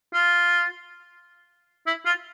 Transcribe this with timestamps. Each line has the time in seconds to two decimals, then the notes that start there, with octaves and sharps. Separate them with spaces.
0.14 F4
1.87 E4
2.06 F4